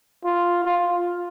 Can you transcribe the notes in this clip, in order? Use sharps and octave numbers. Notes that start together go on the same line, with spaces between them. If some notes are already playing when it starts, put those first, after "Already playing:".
F4
F4